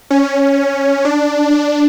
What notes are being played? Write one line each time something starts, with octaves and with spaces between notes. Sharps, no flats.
C#4
D4
D4